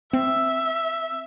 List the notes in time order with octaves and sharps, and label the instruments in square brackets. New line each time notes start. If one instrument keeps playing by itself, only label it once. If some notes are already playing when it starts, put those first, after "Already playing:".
[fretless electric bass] C4 [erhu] E5